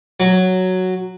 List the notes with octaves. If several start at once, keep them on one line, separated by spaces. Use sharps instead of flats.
F#3